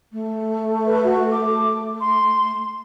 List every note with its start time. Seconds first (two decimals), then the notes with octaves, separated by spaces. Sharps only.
0.12 A3
0.86 B4
1.04 F#4
1.31 D6
2.01 C6